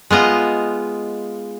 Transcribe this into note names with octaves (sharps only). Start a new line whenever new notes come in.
G#3 B3 F4 D#5